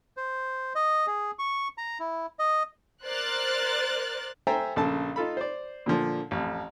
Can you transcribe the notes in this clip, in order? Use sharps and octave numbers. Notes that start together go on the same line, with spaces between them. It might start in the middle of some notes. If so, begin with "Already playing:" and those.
C5
D#5
G#4
C#6
A#5
E4
D#5
A#4 C5 D5 F6 F#6 A6
A4 C5 E5 G5 G#5 A#5
A#1 C#3 A4 A5
D#4 F4 A4 B5
C5 D5
A#2 D3 F3
A1 F2